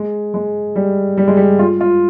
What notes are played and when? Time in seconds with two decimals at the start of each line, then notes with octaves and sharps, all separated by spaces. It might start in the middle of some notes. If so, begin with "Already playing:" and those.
Already playing: G#3
0.34 G#3
0.76 G3
1.17 G3
1.28 G#3
1.37 G3
1.59 F4
1.81 F4